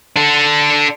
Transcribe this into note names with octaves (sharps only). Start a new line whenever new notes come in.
D4 A4